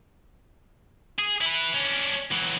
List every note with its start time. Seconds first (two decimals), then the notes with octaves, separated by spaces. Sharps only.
1.18 G#4
1.41 E4 B4
1.74 C#4 D4
2.31 E3 F#3